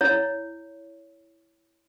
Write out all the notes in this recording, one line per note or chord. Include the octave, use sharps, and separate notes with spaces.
E4 C#5